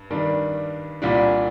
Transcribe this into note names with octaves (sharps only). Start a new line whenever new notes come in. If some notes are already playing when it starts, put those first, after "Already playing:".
Already playing: G2
G2 D#3 G3 D4
C2 A#2 G3 D4